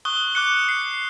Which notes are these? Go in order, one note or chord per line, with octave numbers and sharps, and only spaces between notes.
C#6 D#6 F#6 G7
D6 F#6 C#7
C7